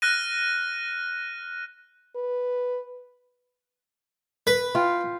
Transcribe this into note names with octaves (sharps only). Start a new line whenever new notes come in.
F6 F#6 A#6 D#7
B4
B4
F4 G5